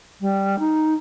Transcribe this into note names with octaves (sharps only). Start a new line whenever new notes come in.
G3
D#4